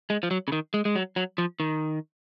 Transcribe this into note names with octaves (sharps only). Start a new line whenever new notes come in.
G#3
F3
F#3
C#3
D#3
G#3
G#3
F#3
F#3
F3
D#3